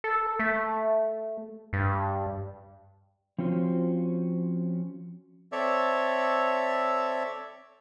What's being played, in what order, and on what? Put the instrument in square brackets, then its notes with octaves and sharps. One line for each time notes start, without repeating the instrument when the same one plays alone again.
[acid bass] A4
A3
G2
[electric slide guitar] F3 C4 C#4 F4 F#4 C5
[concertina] C4 A4 C#5 D5 E5